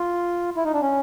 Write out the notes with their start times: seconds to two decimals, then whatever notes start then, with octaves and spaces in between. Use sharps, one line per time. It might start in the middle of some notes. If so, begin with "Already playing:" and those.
Already playing: F4
0.56 E4
0.65 D#4
0.74 D4
0.82 C#4